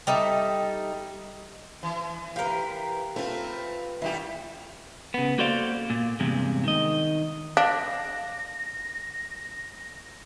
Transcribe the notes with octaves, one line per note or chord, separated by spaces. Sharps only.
G3 D#4 A4 E5
E3
G4 A#4 B4 F5
A3 C4 F4 B4
A#2 E3 G3 G4
C#3 B3
A#3 F#4 A4 C5 D5 F5
A#2
E2 G2 C3 G#3
D#3 D#5
D4 F5 A#6